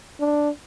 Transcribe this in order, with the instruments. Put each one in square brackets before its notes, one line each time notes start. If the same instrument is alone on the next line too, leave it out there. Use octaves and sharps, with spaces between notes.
[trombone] D4